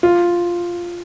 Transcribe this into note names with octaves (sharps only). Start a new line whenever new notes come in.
F4